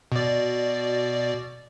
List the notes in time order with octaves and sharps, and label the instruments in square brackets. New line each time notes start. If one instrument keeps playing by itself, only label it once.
[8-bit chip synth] B2 D5